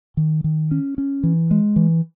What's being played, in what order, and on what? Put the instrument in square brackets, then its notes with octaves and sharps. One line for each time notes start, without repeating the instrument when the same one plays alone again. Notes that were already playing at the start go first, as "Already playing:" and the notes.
[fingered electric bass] D#3
D#3
C#4
C#4
E3
G#3
E3